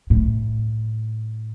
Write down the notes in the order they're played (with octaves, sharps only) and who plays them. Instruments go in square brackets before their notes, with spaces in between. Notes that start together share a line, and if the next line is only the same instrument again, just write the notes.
[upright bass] A2